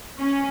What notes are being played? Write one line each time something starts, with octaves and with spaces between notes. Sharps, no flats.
C#4